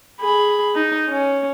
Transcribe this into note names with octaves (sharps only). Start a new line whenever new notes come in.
G#4 B5
D#4
C#4